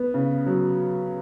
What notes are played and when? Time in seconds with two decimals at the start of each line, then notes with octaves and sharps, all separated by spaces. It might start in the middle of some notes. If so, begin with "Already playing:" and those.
Already playing: B3
0.14 C#3
0.46 F#3